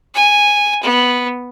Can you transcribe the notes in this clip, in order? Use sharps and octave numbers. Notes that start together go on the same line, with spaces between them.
G#5
B3